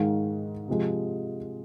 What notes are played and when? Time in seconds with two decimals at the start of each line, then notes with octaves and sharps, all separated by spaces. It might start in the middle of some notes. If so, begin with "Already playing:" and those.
Already playing: G#2 D#3 G#3 F5
0.68 C3 F3 G#3